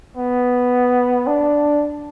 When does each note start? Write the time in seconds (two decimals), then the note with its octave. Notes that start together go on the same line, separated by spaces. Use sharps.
0.17 B3
1.27 D4